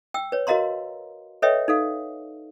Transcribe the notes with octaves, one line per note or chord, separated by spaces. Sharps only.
G5 E6
B4 C#5
F#4 A#4 D#5 F5 A#5 C6
A4 B4 C#5 D#5 E5 G5
D#4 A4 F5